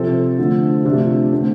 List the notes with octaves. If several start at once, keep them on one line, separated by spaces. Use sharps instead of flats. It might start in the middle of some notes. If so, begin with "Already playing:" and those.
Already playing: C3 F3 C4 A4 C5
D3 F3 A3
C3 F3 A3 D4 F4
G4
F4
D3 A3 C4